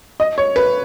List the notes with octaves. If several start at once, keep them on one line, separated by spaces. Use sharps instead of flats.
D#5
C#5
B4